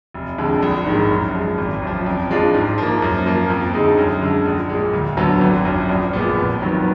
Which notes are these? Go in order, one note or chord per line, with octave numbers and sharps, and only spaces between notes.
F1
F2 D3 G#3
A#1
G#2 D#3 G#3
F#2
F3 G#3
G#1
F#2 F3
F2
F3 G#3 D4 F4
G#2
F3 A#3
F#2
F3 A#3
F2
D3 G#3 D#4 G#4
F#2
D3 G#3
A#1
A#2 G#3
D2
D3 F#3 B3
G#1
F#2 F3
A#1
A#2 G#3 B3
F2
D#3 F#3 B3